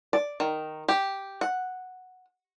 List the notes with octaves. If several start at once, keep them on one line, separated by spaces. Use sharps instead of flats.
D5
D#3
G4
F#5